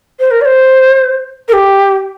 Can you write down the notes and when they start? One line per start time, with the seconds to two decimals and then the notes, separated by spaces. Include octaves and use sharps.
0.19 C5
0.31 A#4
0.41 D5
0.45 C5
1.48 A#4
1.52 G4